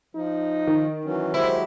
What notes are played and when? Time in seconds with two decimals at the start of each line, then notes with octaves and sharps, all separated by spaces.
0.15 F3 D#4
0.67 D#3
1.05 E3 F#3 C#4
1.34 F#3 G#3 E4 G4 C5